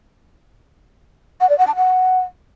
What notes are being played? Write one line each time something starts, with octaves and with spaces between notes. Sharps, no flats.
F#5
D5
F#5
A5
F#5